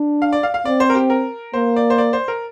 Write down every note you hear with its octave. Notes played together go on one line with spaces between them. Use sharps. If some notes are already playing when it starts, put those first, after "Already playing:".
Already playing: D4
F5
D5
F5
F5
C4 D5
C5
A#4
G4
A#4
A#3 C5
D5
C5
D5
C5
A#4